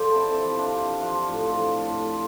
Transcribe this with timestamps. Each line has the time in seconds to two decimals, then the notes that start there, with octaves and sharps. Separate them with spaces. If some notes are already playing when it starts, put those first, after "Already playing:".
Already playing: F3 A4 C5 D5
0.15 C3 C4 E4
0.44 F3
0.52 G4
0.58 D4 F4
0.73 C3
1.01 F3 D4 F4
1.30 A2
1.44 F4 A4
1.58 F3
1.87 A2